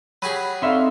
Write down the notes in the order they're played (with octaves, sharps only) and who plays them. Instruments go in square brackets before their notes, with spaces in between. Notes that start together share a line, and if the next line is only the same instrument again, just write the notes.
[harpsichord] F#3 G4 G#4 [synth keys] B5 D#7
[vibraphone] C4 A4 [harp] D#4 E5 F5 [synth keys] D5 C6 C#6